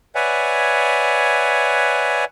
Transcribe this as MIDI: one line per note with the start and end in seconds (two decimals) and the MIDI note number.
0.15 2.25 71
0.15 2.25 73
0.15 2.25 74
0.15 2.25 76
0.15 2.25 78
0.15 2.25 80